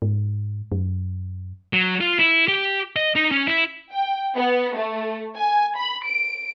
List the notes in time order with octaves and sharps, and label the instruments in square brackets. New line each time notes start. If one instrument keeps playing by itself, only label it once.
[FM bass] G#2
F#2
[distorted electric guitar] F#3
F4
E4
G4
D#5
D#4
C#4
E4
[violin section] G5
B3
A3
G#5
B5
D7